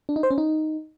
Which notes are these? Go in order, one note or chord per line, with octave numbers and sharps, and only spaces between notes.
D4
D#4
C5
C#4
D#4